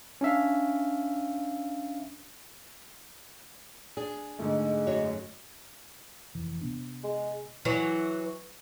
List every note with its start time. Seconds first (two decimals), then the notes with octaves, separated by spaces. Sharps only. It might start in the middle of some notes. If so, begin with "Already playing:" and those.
0.21 C#4 D4 E5 F5
3.97 D4 G#4
4.39 G#2 D3 G#3 A3
4.87 F#2 F#4 C#5
6.35 F1 E3
6.61 C3 B3 D4
7.04 G#3
7.65 E3 F#3